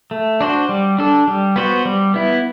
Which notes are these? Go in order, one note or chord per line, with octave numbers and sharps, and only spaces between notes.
A3
D4 F#4 C5
G3
D4 A4
G3
B3 F#4 C5
G3
B3 E4